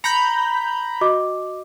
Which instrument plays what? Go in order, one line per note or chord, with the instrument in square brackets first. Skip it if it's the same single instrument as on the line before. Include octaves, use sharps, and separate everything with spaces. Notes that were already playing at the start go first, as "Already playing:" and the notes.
[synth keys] A#5 B5 G6 [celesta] C#7
[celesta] F#4 D#5 D6